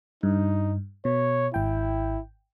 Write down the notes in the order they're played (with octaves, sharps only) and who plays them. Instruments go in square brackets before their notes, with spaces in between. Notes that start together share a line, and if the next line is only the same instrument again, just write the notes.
[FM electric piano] G2 [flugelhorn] D#4
[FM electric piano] B2 [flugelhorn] C#5
[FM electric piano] G#1 G5 [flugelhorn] E4